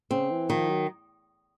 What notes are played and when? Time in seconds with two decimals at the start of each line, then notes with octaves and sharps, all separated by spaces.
0.11 C#3 C4
0.30 E3
0.50 D#3 F3
0.69 F#3